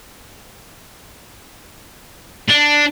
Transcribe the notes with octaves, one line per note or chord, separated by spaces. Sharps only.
D4